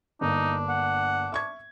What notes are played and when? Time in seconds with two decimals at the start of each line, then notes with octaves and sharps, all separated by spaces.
0.21 G1 A#3 D4 D#4
0.69 F#5
1.32 E5 C#6 G#6